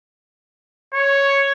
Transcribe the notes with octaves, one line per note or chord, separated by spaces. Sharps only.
C#5